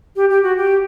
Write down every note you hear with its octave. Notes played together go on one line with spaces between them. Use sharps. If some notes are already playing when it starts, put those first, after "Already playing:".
G4
G4
F#4
G4